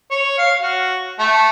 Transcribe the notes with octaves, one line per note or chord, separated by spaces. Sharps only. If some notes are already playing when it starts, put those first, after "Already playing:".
C#5
F5
F#4
A3